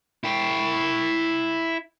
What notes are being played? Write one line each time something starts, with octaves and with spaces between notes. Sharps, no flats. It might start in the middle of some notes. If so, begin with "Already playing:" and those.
E4 G5